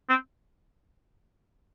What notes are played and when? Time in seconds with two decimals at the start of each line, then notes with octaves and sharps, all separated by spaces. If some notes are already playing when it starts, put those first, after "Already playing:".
0.09 C4